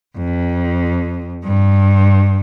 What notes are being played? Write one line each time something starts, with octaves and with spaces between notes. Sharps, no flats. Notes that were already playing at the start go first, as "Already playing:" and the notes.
F2
G2